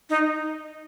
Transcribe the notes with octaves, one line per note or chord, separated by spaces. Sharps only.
D#4